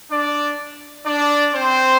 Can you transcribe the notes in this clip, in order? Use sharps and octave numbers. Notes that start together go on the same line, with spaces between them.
D4 D5
D4 D5
C4 C5